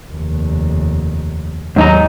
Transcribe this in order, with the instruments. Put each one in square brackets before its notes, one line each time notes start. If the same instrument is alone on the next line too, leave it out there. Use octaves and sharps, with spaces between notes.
[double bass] F1 D#2
[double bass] D#2 [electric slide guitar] G#2 D#4 A#5 [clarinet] F#3